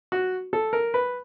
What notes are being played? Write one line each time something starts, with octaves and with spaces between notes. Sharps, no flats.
F#4
A4
A#4
B4